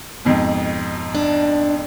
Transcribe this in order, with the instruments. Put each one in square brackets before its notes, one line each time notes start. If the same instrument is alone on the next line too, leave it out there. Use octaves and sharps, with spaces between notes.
[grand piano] F2 G#2 B2
[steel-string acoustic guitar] D4